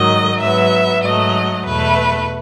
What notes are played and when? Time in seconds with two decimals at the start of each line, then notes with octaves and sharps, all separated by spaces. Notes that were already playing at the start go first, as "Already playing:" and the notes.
Already playing: G#2 D#3 F#3 D#5
0.40 G#2 F#3 B3 E5
1.03 G#2 F#3 A3 D#5
1.66 E2 B2 A3 B4